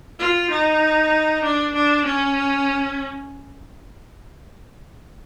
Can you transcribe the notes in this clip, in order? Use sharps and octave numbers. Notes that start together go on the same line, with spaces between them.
F4
D#4
D4
D4
C#4